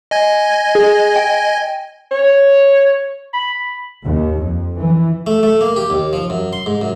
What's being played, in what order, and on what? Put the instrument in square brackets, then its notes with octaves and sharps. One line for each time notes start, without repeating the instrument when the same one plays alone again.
[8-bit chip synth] D#5 G#5 G#6
[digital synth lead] G#4
G5
[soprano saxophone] C#5
B5
[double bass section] D#2
F2
E3
[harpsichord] A3
A3
A#3
G4
D#2
F3
F#2
C6
G#2
F#2